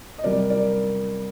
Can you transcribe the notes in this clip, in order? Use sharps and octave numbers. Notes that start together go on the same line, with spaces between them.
D#5
C3 G3 A#4 D5
A#4 D5